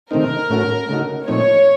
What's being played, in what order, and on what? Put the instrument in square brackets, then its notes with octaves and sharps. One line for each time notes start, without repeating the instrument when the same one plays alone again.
[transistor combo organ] C3 D#3 A3 C4 D#4 [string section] A#4
[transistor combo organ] A2 A3 C#4 F#4
C#3 A3 D#4 F#4
[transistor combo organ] A#2 F3 A3 C4 D#4 [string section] C#5